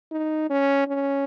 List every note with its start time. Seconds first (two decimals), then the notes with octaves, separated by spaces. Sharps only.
0.12 D#4
0.50 C#4
0.88 C#4